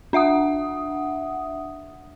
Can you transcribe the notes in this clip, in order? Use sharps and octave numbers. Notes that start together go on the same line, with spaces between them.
D4 E5 F#5 D#6